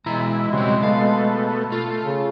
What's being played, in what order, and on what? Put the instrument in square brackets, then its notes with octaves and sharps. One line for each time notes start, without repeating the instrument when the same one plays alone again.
[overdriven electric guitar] B2 A#5 [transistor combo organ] E3 E4 [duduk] G#3
[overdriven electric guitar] C#3 E4 [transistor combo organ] F#3 G3 C4
[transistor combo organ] B2 A3 [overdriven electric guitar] F5
[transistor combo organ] A3 [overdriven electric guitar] F4
[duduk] C#3